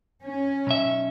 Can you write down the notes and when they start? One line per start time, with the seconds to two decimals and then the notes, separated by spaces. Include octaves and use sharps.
0.24 C#4
0.67 B1 E5